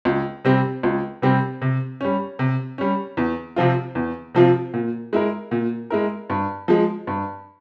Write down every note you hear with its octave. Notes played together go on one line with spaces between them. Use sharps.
C#2
C3 G3 C4 G4
C#2
C3 G3 C4 G4
C3
G3 C#4
C3
G3 C#4
E2
C3 F3 C4 F4
E2
C3 F3 C4 F4
A#2
G#3 E4 A#4
A#2
G#3 E4 A#4
G2
F3 G#3
G2